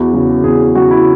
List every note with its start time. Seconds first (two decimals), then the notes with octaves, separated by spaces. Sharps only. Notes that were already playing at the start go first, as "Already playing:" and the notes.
Already playing: E2 F#4
0.13 C#3 F#3
0.44 E2 G#4
0.75 C#3 F#3 F#4
0.91 E4